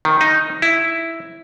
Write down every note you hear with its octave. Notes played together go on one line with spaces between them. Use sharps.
D#3
D#4
E4